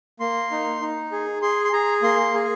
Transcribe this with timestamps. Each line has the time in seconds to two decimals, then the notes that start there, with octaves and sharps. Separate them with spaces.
0.20 A#3 C6
0.51 D#4
0.82 D#4
1.12 G#4
1.42 G#4 C6
1.65 C6
1.73 G#4 A#5
2.02 A#3 C6
2.34 G#4